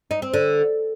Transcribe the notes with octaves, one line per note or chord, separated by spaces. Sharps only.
D#4
C4
D3